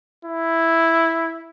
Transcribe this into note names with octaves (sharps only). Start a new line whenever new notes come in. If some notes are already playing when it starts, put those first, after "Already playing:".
E4